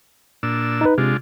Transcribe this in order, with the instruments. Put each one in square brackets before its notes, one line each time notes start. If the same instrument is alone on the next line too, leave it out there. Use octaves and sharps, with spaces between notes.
[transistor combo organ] A#2 D4 E6
[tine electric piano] D#4 B4
[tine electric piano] C3 [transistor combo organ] G#3 D4 F4